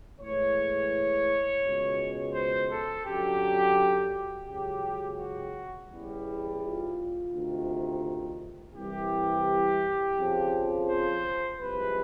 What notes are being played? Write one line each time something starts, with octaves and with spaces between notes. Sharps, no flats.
A2 E3 G#3 C#5
C#2 B2 G#3
C5
A4
F#2 D3 F#3 G4
C#2 C#3 F#3 G4
F#4
E2 C#3 E3 G3
F4
D2 C3 D#3
C2 C3 E3 G3 G4
F2 C#3 F3
C5
C2 C3 F3 G#3 B4